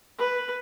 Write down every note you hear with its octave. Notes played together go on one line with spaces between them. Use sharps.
B4